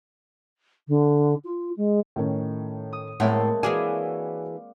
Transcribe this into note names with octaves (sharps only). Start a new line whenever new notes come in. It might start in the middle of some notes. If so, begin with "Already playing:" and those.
D3
F4
G#3
A2 D#3 C#4
D#6
A2 G#3 A#3 C4 C#5 E5 F#5
E3 F#4 G#4 D5 F5 D6